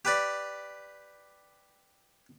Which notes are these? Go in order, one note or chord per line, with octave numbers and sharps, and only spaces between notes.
G4 B4 D5